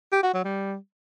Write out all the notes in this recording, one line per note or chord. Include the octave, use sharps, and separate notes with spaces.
G4
F#4
F#3
G3